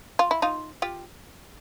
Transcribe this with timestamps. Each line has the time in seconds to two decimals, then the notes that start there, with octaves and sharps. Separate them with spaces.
0.19 F4
0.31 E4
0.42 D#4 F4
0.82 F4 G4